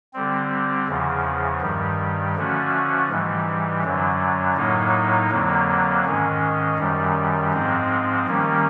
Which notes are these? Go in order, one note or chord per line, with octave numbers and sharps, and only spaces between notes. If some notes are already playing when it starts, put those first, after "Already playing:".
D3 G3 C4
E2 C#3 F3
G2 D#3 G3
D3 F3 A3 C#4 F#4
G#2 E3 G3
F#2 D3 F#3
A2 F#3 A#3 D#4
F2 D3 F#3 A#3
G#2 D#3 G#3 C#4
F#2 D#3 G3
G#2 F3 G#3 C4
D#3 G3 A#3 C#4